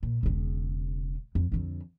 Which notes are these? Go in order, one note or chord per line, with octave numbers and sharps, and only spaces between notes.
A#2
E1 C#3
F2
F2 D3